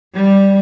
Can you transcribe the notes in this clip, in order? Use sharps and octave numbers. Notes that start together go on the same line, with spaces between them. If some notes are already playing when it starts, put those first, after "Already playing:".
G3